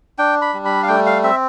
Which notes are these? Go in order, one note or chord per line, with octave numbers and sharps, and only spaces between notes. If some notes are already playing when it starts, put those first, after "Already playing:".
D4 G5
B5
G3
B5
F5
A3 G5
F5
C4 E5